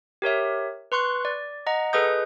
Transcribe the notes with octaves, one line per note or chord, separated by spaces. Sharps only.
G4 A#4 C#5 E5
B4 C6 C#6 F#6
D5
D#5 F#5 A#5
G#4 A4 B4 D#5 D#6 G6